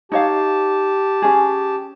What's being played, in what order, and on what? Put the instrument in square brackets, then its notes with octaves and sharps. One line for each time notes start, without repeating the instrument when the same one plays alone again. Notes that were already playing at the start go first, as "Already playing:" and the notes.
[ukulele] D#4 C#5 F5 [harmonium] G4 A5
[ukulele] C#4 G#4